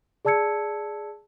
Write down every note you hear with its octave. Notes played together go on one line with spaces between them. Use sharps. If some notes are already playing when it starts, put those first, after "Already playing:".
G#4 D5 A5 E6 G#6 C#7